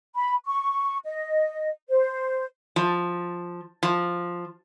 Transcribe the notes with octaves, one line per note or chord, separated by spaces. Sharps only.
B5
C#6
D#5
C5
F3
F3